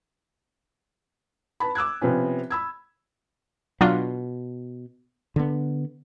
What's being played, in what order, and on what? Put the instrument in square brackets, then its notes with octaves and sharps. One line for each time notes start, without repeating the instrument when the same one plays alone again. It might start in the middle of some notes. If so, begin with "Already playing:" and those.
[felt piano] B4 A5 B5
D6 E6 F#6 G#6
C3 F3 B3 C#4
B5 E6 G#6
[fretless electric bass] B2 [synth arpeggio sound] F#3 D4 F4
[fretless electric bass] D3 B3